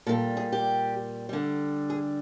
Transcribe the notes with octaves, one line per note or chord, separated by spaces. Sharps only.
A#2 G3 A4
G#4
G4
D3 G3
G#4